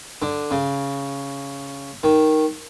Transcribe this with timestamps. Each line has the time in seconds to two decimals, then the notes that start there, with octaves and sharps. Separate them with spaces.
0.22 D3
0.51 C#3
2.03 D#3